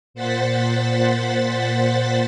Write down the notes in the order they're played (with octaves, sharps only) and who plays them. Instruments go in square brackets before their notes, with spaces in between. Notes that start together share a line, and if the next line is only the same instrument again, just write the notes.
[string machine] A#2 C5 F#5 A6 B6